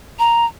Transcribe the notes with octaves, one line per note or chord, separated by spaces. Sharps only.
A#5